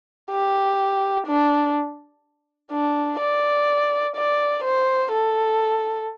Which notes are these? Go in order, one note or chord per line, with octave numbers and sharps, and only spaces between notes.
G4
D4
D4
D5
D5
C5
A4